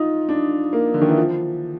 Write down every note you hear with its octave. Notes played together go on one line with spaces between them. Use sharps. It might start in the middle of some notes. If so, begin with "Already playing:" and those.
Already playing: D#4 F4
D4
A#3
D3
D#3
E3
F3